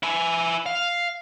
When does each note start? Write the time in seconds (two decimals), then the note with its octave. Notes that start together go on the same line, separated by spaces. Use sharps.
0.03 E4 G#5
0.66 F5